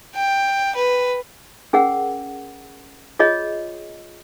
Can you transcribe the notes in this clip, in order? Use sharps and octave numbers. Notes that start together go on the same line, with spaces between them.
G5
B4
C#4 G#4 A#4 F#5
F4 G#4 C#5 D#5